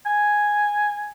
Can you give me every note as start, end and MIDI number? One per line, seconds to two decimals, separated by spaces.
0.06 1.12 80